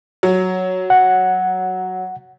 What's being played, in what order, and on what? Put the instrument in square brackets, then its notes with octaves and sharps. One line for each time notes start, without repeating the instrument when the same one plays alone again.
[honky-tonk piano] F#3
[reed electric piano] F#5